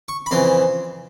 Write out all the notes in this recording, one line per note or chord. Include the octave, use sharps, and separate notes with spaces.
C#6
B5
F2 C#3 E3 C6